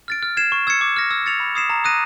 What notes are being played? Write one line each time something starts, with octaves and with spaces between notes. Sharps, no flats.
F6 A6 D7
F6
G#6 C7 E7
C#6
E6 G#6 C#7
D6
F6 A#6
E6
A6 C#7 F7
B5
D#6 G#6 C7 E7
A#5
D#6 F#6 A#6 D#7